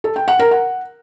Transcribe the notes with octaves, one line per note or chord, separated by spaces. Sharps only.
A4
G5
F#5
A#4
F#5